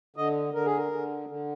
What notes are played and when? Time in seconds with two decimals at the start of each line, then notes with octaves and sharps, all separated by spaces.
0.16 D3 D#5
0.54 D3 A#4
0.66 G#4
0.77 A#4
0.92 D3
1.29 D3